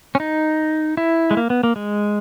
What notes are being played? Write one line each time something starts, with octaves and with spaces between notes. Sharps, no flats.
C#4
D#4
E4
G#3
A#3
B3
A#3
G#3